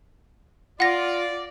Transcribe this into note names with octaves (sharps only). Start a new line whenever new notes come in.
F4 D5 F#5 A#6